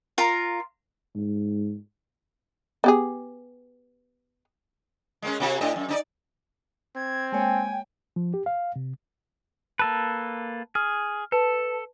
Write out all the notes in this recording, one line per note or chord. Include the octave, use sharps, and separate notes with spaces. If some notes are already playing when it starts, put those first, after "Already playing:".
F4 A#4 A#5
G#2
B3 G4 G#4
G#3 A#3 C#4
C3 A#3 F#4
A2 D4 D#5
F#2
D4 D#4 D5
C4 G#6
G#3 A#3 C#5 G5 G#5
F3
G4
F5
C3
A#3 A4 B4 A5
G#4 F6
A4 B4 A5